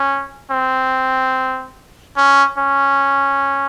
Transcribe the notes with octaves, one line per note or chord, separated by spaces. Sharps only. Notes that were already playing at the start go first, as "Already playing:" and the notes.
Already playing: C#4
C4
C#4
C#4